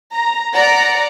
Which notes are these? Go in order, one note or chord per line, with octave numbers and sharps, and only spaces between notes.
A#5
D5 F#5 A#5